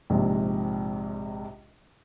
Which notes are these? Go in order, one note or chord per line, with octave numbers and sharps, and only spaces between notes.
A#1 G#2 C3